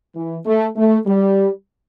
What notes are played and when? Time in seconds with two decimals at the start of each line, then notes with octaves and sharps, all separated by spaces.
0.15 E3
0.46 A3
0.76 A3
1.07 G3